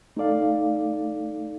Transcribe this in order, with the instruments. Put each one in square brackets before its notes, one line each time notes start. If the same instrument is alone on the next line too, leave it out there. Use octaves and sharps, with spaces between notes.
[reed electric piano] A3 D#4 A4 D5 F5